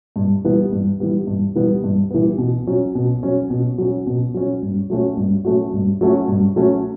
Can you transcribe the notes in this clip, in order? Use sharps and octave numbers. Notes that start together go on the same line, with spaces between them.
G2
E3 G3 B3
G2
E3 G3 B3
G2
E3 G3 B3
G2
E3 G3 B3
B2
F#3 C#4
B2
F#3 C#4
B2
F#3 C#4
B2
F#3 C#4
G2
F#3 A3 C#4 F#4
G2
F#3 A3 C#4 F#4
G2
F#3 A3 C#4 F#4
G2
F#3 A3 C#4 F#4